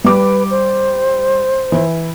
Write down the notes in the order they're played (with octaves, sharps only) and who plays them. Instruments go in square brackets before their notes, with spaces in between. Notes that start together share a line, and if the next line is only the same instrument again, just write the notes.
[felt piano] G3 D6 [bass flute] B4
[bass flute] C5
[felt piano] E3 E4